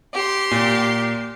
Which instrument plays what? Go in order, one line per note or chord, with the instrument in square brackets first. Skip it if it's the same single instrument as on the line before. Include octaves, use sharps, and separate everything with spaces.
[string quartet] G4 C6
[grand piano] A#2